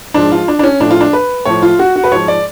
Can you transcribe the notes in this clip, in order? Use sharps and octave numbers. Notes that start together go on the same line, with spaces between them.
G#2 F3 D4
F4
D4
D4
C#4
A2 F3 D4
F4
D4
B4
A2 F3 C#5
F4
F#4
F#4
B4
G#2 F3 C#5
D5